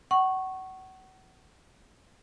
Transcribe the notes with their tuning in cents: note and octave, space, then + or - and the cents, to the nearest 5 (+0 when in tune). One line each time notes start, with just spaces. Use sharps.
F#5 +30 C#6 -10